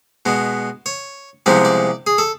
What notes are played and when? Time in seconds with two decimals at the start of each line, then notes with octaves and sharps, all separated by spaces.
0.26 B2 G#3 B3
0.86 C#5
1.46 C2 C3 F3 G#3 B3 D5
1.65 D5
2.07 G#4
2.18 A4